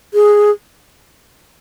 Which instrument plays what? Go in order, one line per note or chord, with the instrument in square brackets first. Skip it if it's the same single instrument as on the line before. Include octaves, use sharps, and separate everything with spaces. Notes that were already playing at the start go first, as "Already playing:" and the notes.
[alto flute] G#4